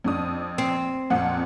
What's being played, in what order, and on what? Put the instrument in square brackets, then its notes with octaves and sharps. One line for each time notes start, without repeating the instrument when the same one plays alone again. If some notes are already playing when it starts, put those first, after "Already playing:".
[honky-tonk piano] F2 D4 D#6
[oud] C4
[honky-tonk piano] F2 A#2 F#5